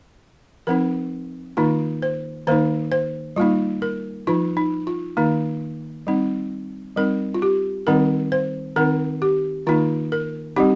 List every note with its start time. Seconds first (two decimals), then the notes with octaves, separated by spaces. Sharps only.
0.67 F3 C4 D#4 A#4
1.57 D#3 A#3 D#4 F4
2.02 C5
2.47 D#3 A#3 D#4 C5
2.92 C5
3.36 G3 A#3 D#4 F4
3.82 A#4
4.27 F3 D#4 F4
4.57 D#4
4.87 F4
5.17 D#3 A#3 D#4
6.07 G3 C4 D#4
6.97 G3 C4 D#4 A#4
7.34 F4
7.42 G4
7.87 D#3 G3 C4 D#4 A#4
8.32 C5
8.76 D#3 C4 D#4 A#4
9.22 G4
9.67 D#3 A#3 D#4 F4
10.12 A#4
10.56 G3 C4 D#4 G4